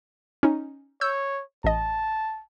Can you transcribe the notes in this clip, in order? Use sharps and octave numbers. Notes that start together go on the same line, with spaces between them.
C#4 D#4
C#5 E6 G6
A1 D#5 A5